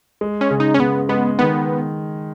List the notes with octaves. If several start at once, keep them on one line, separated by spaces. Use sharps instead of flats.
G#3
C#4
C#3
D#4
C#4
C#3 B3
G#3 B3
D#3 B3